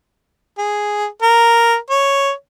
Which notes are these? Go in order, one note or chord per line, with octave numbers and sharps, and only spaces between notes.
G#4
A#4
C#5